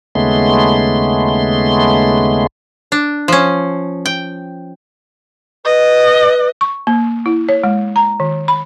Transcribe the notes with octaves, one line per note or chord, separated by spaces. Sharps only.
D#2 C#3 G#3 A3 B3 C6
D4
F3 C#4
G5
B4 D#5
C#6
A#3
E4
C#5
G#3
A#5
D#3
B5